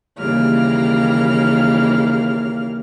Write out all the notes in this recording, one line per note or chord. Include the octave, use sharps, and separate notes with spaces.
D#2 C#3 E3 G3 A#3 F6